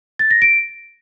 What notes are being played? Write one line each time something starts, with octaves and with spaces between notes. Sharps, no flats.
A6
A#6
D7